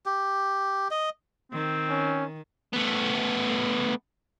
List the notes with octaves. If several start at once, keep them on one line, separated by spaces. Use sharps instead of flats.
G4
D#5
D#3 C4
C#4
A3 B3